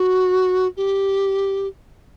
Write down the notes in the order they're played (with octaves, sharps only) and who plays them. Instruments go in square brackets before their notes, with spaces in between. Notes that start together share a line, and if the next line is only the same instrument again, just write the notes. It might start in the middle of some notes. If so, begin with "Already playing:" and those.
Already playing: [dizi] F#4
G4